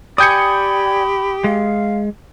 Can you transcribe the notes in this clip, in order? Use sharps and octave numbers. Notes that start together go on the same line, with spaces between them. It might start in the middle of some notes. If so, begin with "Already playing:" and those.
G4 D5 G5 G#5 B5 D#6 G6 C#7
G#3 F5